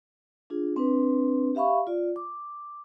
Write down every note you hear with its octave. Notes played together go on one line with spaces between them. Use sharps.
D4 F4 G#4
C4 D4 B4
G4 E5 F5 B5 C#6
F4 D5
D6